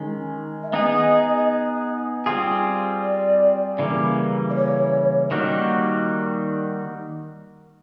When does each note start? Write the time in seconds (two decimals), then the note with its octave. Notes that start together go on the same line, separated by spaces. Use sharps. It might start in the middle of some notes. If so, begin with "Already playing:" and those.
Already playing: D#3 G#3 C#4
0.63 E5
0.73 B3 D#4 G#4 D#5
2.26 G3 C4 F4 G#4
3.02 D5
3.79 C#3 E3 G3 A#3
4.50 D5
4.55 C#5
5.31 D#3 G3 A#3 D#4 F#4